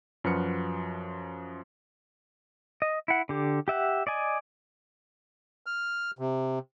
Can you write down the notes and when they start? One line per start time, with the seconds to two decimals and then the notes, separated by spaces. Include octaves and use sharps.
0.24 F#2 F3 F#4 B4 F6 C#7
2.82 D#5
3.08 E4 F#5
3.29 D3 G4
3.68 G4 E5 F#5
4.07 D5 D#5 G#5
5.66 F6
6.19 C3